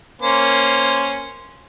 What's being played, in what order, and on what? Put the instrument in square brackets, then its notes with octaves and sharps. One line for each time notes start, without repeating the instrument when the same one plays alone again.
[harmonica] A#3 C#4 C5